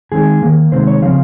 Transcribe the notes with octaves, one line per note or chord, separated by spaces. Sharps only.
D#3 G#3 C4 G#4
D#3 A#3
C3 D#3 G#3 C4 C5
C#5
C#3 F3 C4 F5